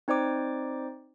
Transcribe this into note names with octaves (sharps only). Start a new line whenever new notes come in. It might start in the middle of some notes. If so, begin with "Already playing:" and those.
C4 D#4 C5 D5 D6